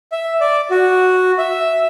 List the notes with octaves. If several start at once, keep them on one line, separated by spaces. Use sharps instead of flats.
E5
D5
F#4
E5